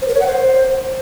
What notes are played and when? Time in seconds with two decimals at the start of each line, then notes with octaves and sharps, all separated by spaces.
0.02 C5
0.08 A#4
0.14 C#5
0.21 F#5
0.27 C5